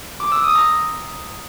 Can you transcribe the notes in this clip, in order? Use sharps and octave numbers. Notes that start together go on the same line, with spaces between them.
D6
E6
D#6
A#5